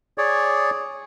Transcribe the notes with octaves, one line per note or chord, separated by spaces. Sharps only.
G#4 C#5 D5